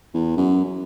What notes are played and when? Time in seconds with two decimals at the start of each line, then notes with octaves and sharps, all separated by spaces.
0.14 E2
0.37 F#2
0.64 F#2